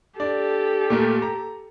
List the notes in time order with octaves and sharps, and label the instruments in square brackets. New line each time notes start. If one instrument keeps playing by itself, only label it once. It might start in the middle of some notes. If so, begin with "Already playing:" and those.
[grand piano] D4 D5 [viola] G4 A4
[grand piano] A#2 A3 A#4
A#5